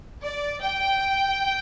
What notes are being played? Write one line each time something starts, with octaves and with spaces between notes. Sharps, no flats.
D5
G5